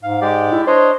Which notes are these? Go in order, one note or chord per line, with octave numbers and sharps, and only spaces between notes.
G#2 F5
G#3 G4 D5
E4
D4 C5 C#5 D#5